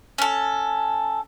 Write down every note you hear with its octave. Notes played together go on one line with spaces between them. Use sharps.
C#4 A4